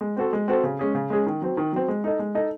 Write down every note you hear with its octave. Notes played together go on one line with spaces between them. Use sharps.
G#3
C4 F#4 A4 C5
G#3
C4 F#4 A4 C5
C#3
G#3 C#4 G#4
C#3
G#3 C#4 G#4
D#3
F#3 C4
D#3
F#3 C4
G#3
D#4 A4 D#5
G#3
D#4 A4 D#5